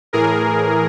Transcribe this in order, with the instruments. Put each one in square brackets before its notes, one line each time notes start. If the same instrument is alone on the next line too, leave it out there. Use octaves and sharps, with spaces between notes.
[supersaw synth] A2 E3 G#4 A#4